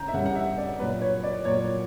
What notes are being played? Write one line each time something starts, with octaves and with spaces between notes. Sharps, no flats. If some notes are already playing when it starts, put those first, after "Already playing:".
Already playing: C#3 A#5 G6
E5
C#3 G3 F#5
F#5
E5
D5
A#2 F#3 B4
C#5
D5
A#2 F#3 C#5